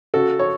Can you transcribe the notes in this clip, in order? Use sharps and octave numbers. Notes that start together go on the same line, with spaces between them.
C#3 F#4 A4
C#5